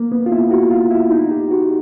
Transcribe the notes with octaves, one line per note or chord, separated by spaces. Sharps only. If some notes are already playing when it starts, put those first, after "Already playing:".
Already playing: A#3
B3
F4
E4
F#4
F4
E4
D#4
G4
F#4